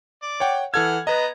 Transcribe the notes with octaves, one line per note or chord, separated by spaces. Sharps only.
D5
C#5 F#5 G5
E3 A4 F#5 F6 G#6
B3 B4 D#5 A#5